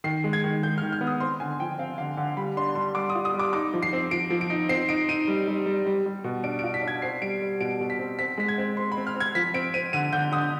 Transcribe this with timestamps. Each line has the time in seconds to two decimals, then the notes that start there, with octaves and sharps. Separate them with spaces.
0.04 D#3 C7
0.24 G#3
0.33 G#6
0.44 D#3
0.63 G#3 G6
0.78 F6
0.82 D#3
0.92 F6
1.01 B3
1.07 D#6
1.20 C4 C6
1.40 D3 G#5
1.60 F3 G5
1.78 C4 F5
1.98 D3 F5
2.17 D3
2.37 G3 B5
2.57 D4 C6
2.75 G3 C6
2.95 G3 D6
3.10 D#6
3.15 F4
3.25 D#6
3.34 G3
3.39 D6
3.53 D#4 D6
3.73 F3
3.83 C7
3.93 C4
4.11 F3 D7
4.30 F3
4.41 D7
4.50 D#4
4.69 C4 C7
4.89 D#4 D7
5.09 D#4 D#7
5.28 G3
5.48 G3
5.66 G3
5.86 G3
6.06 G3
6.24 B2
6.44 D4 D7
6.59 D7
6.63 F4
6.74 B6
6.83 D4 G#6
7.02 C4 C7
7.22 G3 D7
7.42 G3
7.60 B2 D7
7.80 B2
7.90 B6
7.99 C4
8.19 C4 B6
8.38 G#3 B6
8.48 G#6
8.58 C4
8.77 C4 C6
8.92 B5
8.97 C4
9.07 F6
9.15 C4
9.20 G#6
9.35 F3 B6
9.54 C4 D7
9.74 C4 D#7
9.93 D3 D#7
10.13 D3 G6
10.32 D3 D#6